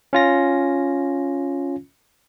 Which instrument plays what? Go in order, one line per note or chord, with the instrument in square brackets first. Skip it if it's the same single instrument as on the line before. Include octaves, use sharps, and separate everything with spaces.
[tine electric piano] C#4 F4 A#6